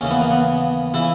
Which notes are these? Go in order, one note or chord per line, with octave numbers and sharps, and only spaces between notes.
D#2 C#3 E3 C#4
B3
A#3
B3
C#3 E3 E4